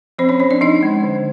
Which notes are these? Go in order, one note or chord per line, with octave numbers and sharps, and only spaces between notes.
F3 C4 C5
C#4 C#5
C4 C#4 C#5
D4 D5
F3 D#4 D#5
G#3
D3